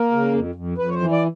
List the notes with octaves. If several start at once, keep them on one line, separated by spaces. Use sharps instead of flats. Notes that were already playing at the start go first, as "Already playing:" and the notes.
Already playing: A#3 A#4
C#3
F2
F2
F2 B4
C#5
C5
E3
D5